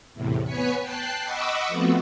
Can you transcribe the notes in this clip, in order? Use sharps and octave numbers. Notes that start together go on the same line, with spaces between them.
E2 A2 C3
B3 B4 C#5 G#5 B6 C#7
G5 A5 F#6 C7
D#5 F#5 B5 C#6 D6 E6
F3 A3 B3 C4 F#4